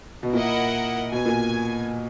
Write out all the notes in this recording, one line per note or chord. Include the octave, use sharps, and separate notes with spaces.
B2
A#2 E4 A#4 D#5 F#5
B2 G#5
A#2